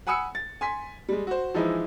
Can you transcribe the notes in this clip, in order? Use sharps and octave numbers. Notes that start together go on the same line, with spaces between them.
F#5 G#5 B5 D#6 E6 C#7
A6
G#5 C6 B6
G3 G#3
F#4 C5
E3 F3 G#3 D#4 E4